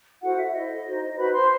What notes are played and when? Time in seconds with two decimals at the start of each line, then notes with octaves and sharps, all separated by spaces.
0.22 E4 F#4 A4 C5 F#5
0.38 E5
0.54 E4 A4 C5 D#5
0.86 D#4 F#4 C5
1.16 D#4 F#4 B4 C5 B5
1.33 C5 C6